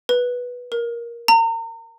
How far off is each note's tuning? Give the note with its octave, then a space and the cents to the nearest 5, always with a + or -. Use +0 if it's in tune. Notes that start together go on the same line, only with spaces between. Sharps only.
B4 -10
A#4 +10
A#5 -35